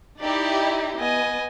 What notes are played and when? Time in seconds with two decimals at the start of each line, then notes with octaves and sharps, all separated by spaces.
0.21 D#4 E4 G4 D5
1.00 B3 D#5 G#5